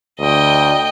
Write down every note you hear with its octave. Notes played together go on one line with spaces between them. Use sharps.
D2 D#5 G5